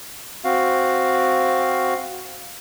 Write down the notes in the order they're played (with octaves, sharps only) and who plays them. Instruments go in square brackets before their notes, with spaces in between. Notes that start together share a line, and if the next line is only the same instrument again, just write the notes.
[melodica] C4 F#4 F5